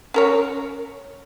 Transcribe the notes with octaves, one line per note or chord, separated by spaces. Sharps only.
C#4 A#4 C#5